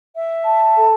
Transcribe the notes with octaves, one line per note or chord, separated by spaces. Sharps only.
E5
A5
A4